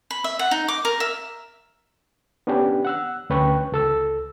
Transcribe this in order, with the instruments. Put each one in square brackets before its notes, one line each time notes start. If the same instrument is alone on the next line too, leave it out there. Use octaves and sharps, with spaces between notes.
[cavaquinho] B5
E5
F#5
D#4
D6
A#4
E5
[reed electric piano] B3 C#4 D4 G4
F#5 E6 F#6
D2 C#4 B4 G5 C#6 F#6
C#2 A4 E6